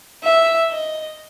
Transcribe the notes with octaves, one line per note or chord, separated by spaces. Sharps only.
E5
D#5